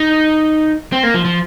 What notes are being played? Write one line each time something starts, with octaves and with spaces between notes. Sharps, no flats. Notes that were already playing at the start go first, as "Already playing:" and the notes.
Already playing: D#4
C4
A#3
F3
F3